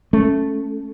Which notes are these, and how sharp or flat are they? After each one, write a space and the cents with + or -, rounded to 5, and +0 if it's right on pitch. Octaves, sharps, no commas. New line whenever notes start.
A3 +0 C#4 +0